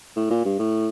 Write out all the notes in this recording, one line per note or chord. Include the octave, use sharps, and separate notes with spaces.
A2
A#2
G2
A2